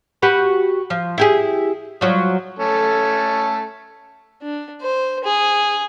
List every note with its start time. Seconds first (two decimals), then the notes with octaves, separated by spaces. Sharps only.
0.22 F#4 G4 B4
0.90 F3
1.18 E4 G4 G#4
2.01 F3 F#3
2.59 A3 C#4 A4
4.42 D4
4.81 C5
5.24 G#4